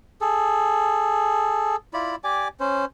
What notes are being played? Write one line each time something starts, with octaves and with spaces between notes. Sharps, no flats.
G#4 A4
E4 F4 D5 B5
G4 D5 G#5 D6
C#4 C5